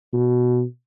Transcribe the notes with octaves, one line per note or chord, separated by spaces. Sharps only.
B2